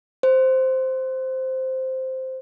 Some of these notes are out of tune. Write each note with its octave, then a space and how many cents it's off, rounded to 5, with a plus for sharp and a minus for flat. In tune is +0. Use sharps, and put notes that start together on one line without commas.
C5 -5